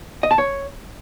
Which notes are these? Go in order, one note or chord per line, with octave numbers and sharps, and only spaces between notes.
D#5
A5
C#5